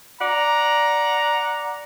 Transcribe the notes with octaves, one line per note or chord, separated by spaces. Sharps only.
D5 F#5 A#5